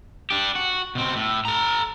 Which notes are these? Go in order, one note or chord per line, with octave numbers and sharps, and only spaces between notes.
D4 G4
F#4
B2 C4
A2
A4 A#5